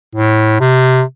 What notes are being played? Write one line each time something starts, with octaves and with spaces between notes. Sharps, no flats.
A2
C3